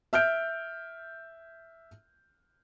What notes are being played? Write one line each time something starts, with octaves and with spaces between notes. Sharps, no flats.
E5 F6 G6 D7